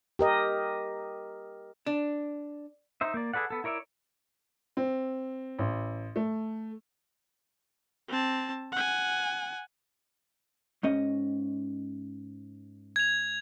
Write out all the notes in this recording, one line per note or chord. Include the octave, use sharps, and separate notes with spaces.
G4 A#4 D#5
D4
D#4 C5 E5
A#3 D5
G#4 A4 B4 D5 F#5
B3 A4
E4 A#4 C#5 D5 E5
C4
A1
A3
C4 A5
F#5 G#5
G#2 C#4 D#5
G#6 F7